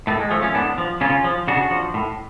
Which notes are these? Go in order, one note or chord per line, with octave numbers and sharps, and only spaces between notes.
A2 A3
G#3
F3 A3
A3 C#4
A2 B3 D4
F3
C#3 C#4 F4
F3
C#3 D4 F#4
F3
A2